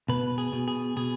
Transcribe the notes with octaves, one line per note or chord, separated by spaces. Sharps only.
B2 B4
G#4
B2
G#4
B2 G#4